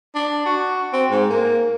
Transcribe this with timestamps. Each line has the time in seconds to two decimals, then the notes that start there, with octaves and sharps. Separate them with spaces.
0.15 D4
0.46 F#4
0.93 C4
1.11 G#2
1.30 A#3